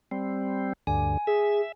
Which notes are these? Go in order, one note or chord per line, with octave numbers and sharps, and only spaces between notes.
G3 C4
D2 G2 D3 G#5
G#4 E5